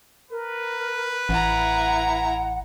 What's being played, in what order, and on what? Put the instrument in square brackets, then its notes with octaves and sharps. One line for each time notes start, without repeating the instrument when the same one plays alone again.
[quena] A#4 [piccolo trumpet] B4
[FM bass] A1 [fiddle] E4 A#5 [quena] F#5